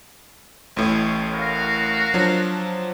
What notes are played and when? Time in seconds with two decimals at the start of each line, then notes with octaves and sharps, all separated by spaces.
0.77 A1 A2
1.33 F#4 A#4 F5
2.14 F3 F#3 D4